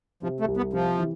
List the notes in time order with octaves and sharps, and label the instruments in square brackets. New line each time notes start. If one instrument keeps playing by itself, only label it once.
[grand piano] C3 [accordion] F3
[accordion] A3
[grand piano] C2
[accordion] B3
[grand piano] C3 [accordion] F3
[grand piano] E3